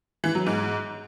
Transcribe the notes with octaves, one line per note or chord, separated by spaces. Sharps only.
E3
F#3
G#2